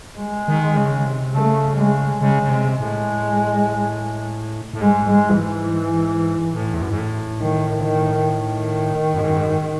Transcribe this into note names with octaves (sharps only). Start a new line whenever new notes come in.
G#3
D#3
C#3
C3
C#3 A3
G#3
C#3 G#3
C#3
C3
G#3
A2
A2
G#2 G#3
G#3
E3
A2
E2
F#2
G#2
A2
D#3
D#3
D#3
F#2
G#2
F#2
G#2
F#2
G#2